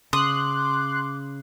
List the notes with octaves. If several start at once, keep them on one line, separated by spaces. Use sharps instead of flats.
C#3 C6 D6 D#6 F#6